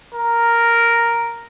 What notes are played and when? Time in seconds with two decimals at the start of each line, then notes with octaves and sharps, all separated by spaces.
0.15 A#4